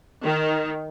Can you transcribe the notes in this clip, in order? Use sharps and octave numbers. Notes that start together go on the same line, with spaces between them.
D#3